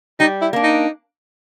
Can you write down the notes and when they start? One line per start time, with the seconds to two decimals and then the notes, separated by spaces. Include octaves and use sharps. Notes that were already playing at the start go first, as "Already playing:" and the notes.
0.20 G3 D#4
0.41 E4
0.53 A#3 D4
0.63 D#4